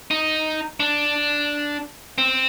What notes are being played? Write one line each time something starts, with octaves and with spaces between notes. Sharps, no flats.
D#4
D4
C4